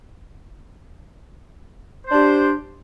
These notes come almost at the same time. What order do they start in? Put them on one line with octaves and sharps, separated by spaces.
C5 D4 G4